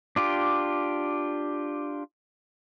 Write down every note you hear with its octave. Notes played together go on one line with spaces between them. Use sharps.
D4 F4 G4